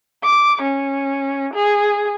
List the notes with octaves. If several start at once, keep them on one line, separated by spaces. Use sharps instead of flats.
D6
C#4
G#4